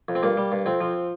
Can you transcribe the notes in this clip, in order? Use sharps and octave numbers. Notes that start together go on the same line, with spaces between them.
F2
C4
G2 A#3
G3
G2
F2 C4
F3